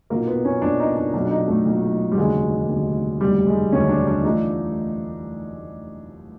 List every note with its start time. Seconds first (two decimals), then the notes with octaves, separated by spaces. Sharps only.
0.10 B1 A#2 F#3 A#3
0.27 B3
0.45 C#4
0.62 B1 A#2 F#3 D4
0.80 D#4
0.97 D4
1.13 B1 A#2 F#3 D4
1.25 D4
1.31 D#4
1.48 A3
1.66 B1 A#2 F#3
2.12 G3
2.17 F1 D#2 D3 F#3 G#3
2.69 F1 D#2 D3 F#3
3.20 F1 D#2 D3 F#3 G3
3.47 G#3
3.72 F1 D#2 D3 F#3 C#4
3.89 D4
4.07 D4
4.23 E3 A3 D4 D#4 F4